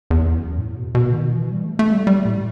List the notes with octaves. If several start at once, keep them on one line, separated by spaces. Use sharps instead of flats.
E2
F#2
A2
B2
B2
D#3
E3
G3
A3
A3
G3
G3
A2